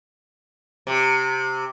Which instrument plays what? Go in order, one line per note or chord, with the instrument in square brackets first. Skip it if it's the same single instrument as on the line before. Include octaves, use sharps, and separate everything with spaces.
[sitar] C3